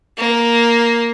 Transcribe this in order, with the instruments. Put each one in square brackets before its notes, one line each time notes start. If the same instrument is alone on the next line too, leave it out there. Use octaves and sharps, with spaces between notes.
[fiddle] A#3